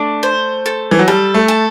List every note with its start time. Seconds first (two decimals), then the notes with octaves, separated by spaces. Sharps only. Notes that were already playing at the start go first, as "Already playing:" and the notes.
Already playing: A3 D4
0.23 C5
0.66 A4
0.91 E3
0.99 F#3
1.08 G3 A4
1.34 A3
1.48 A4